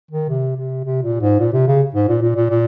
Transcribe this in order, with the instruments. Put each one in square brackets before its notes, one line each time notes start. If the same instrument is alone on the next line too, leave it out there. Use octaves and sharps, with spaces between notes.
[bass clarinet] D#3
C3
C3
C3
A#2
G#2
A#2
C3
C#3
G#2
A#2
A#2
A#2
A#2